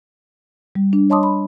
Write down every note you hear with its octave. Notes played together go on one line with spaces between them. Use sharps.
G3
D4
C#5 D#5 A5 C6 D6 D#6
B5